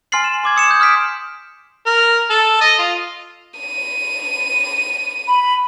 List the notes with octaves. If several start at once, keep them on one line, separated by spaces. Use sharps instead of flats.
G#5 C6 F6 A6 C7 F#7
E7
C6 D6 G#6
D#6 C#7 E7
D#6 G6
D#6 F6 G6 B6 D7
A#4
A4
D#5
F4
D#7
B5